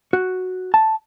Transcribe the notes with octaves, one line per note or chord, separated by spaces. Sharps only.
F#4
A5